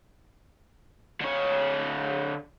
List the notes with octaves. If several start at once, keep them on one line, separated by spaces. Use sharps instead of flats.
D3 C#5